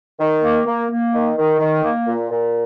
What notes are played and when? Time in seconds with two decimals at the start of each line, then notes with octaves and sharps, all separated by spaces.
0.18 D#3
0.42 A#3
0.66 A#3
0.89 A#3
1.13 D#3
1.36 D#3
1.59 D#3
1.84 A#3
2.07 A#2
2.30 A#2